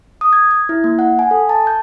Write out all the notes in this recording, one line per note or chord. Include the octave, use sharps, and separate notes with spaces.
D#6
G#6
G#6
E4
A#3
F#5
G#5
A4
A5
G6